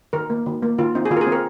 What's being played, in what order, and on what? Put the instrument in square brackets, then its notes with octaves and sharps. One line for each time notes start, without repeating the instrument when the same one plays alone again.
[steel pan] D#3 A#4
A#3
D#3
A#3
D#3 F4
C4 D#4
G#4
D#3 F4
A#4
G#4
C4
A#4